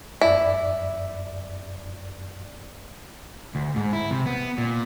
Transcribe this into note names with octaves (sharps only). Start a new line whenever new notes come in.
F#2 E4 D5
D2
G#2
E4
C3
B3
A#2